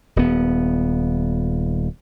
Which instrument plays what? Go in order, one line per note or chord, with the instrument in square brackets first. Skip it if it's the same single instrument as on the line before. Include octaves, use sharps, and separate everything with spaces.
[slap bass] D#1 B3